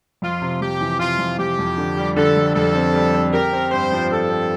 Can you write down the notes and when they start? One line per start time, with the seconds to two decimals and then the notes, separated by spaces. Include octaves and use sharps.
0.22 F2 F4
0.42 C3
0.61 F2 G4
0.81 E3
1.00 C3 F4
1.19 F2
1.38 F2 G4
1.59 F2
1.78 D3
1.97 G3
2.16 D3 A4
2.36 F2
2.55 F2 A4
2.75 C4
2.94 G3
3.14 C4
3.33 G4 A#4
3.53 C4
3.71 G2 C5
3.92 F3
4.11 G2 A4
4.30 C4